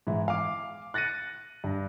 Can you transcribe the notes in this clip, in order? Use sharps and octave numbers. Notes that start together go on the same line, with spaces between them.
G#2 E3 E4
F5 D6
F#6 A6 A#6 C#7 D#7
G2